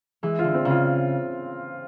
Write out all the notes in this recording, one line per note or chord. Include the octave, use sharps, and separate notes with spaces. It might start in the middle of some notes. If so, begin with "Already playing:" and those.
E3 G#3
D3 F4
C4
C#3
F4